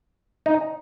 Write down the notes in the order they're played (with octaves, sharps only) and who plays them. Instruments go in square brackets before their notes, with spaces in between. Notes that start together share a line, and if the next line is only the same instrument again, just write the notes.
[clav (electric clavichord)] D#4